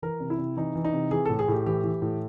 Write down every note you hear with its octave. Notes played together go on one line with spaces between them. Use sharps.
E3 A#4
C3
E4
C3
E3 D#4
E3
D#4
C3
E3 G#4
A2 A4
G#4
A2 G4
E3 G4
E3
A2